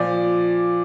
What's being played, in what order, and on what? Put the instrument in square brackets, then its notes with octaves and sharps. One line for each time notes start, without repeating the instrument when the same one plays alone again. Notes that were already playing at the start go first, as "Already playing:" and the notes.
Already playing: [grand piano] A#2 F3 D5